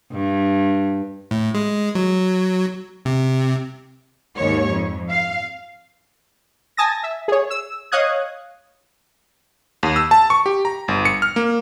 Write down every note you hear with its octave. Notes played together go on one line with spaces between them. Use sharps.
G2
A2
G#3
F#3
C3
D#2 G#2 C#5
F2
F5
G#5 A5 D#6 A6 A#6
E5
G#4 C#5
E6
C#5 D#5 F5 D#6 F#6 G#6
D#2
E6
A5
C#6
G4
A#5
G1
C#7
F6
A#3